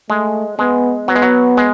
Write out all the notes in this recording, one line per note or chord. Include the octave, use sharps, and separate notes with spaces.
G#3 A3
G#3 B3
F#3 B3
G#3
F#3
G#3